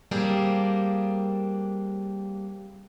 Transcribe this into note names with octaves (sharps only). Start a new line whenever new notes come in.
G3 A#3 C4 D4 G#4